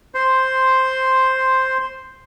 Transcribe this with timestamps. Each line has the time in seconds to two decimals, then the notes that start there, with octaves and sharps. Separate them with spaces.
0.14 C5 C6